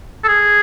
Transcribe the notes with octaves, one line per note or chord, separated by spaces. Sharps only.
A4
G#4